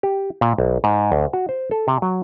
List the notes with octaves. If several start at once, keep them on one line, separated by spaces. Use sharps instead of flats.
G4
A#2
B1
G#2
D2
F#4
C5
A4
C3
F#3